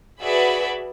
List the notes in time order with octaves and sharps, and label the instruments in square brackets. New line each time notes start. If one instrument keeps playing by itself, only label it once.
[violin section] F#4 G#4 B4 D5 E5 B5